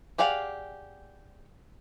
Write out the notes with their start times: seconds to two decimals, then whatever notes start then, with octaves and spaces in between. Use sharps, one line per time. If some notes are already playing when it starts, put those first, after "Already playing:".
0.18 G4 G#4 D5 F5 F#5